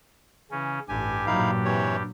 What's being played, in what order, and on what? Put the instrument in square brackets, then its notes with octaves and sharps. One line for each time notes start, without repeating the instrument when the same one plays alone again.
[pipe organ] C#3 C#4 [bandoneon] E3
[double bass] A1 [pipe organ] G2 G4 [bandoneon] G#5
[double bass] A#2 F#3 [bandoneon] D#4 E4 F5
[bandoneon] C3 E3 C#5